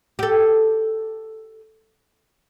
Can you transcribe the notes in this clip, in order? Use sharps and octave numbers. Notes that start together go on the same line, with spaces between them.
G4 A4